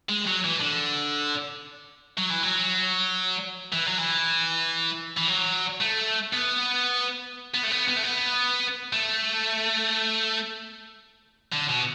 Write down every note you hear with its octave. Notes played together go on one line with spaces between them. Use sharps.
G#3
F#3
E3
D3
F#3
E3
F#3
E3
F#3
E3
E3
F#3
A3
B3
B3
A3
B3
B3
A3
B3
A3
D3
B2